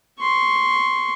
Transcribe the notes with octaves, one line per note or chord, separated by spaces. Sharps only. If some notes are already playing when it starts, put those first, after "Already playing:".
C6 C#6